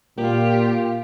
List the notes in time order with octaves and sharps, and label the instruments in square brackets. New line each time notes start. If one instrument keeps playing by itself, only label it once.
[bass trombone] A#2 [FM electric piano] A#3 [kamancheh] F4 G4